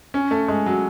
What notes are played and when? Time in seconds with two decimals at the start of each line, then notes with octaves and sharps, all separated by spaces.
0.14 C#4
0.31 A3
0.48 G#3
0.66 F#3